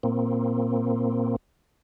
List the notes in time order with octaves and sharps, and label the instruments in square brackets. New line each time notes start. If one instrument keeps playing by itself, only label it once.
[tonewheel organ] A#2 A#3 C4